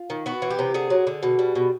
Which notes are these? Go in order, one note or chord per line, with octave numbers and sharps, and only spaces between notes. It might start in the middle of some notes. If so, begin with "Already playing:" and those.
Already playing: F4
D#3
B3 F#4
E3
G4
C3
D3 G#4
F#3
D3
B2
G3
B2